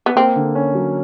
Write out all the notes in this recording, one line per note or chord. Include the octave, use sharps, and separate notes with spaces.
B3
A#3 C4
D3
C#4
F#3